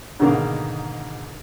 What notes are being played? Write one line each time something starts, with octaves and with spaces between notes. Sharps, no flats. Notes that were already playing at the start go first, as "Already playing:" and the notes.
G#2 B2 D3 D#3 A#3